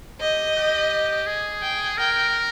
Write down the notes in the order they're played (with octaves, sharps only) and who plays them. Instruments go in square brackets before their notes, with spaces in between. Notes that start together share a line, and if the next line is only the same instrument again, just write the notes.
[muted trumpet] G4 [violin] D#5
[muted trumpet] G4
G#4
[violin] G5
[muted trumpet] A#4 [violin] G5